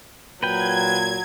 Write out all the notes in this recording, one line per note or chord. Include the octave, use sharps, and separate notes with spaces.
A#2 F#3 B4 G5 G#6